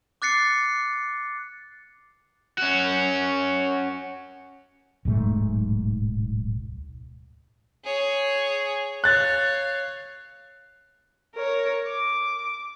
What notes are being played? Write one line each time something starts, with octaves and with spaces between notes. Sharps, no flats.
D6 F#6 A6 C7 C#7
C#4 F#4
D1 B1 G#2 A3
G#4 C#5
C#5 F5 F#6 A6
A#4 C#5
D6